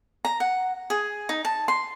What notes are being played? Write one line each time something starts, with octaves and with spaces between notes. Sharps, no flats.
A#5
F#5
G#4
D#4
A5
C6